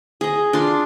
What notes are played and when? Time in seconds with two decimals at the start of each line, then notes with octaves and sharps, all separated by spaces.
0.21 G#4 D#5
0.53 D4 F4 C6